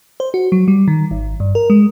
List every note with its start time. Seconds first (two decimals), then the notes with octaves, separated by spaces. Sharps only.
0.20 C5
0.34 F#4
0.52 F#3
0.68 G3
0.88 D#3
1.11 G#1
1.40 G2
1.55 A#4
1.70 G#3